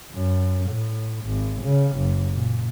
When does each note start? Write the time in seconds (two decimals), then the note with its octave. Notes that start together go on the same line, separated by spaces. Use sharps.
0.12 F#2
0.69 A2
1.25 G#1
1.62 C#3
1.97 F#1
2.33 A#2